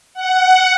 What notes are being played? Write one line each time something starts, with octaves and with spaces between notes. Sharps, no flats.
F#5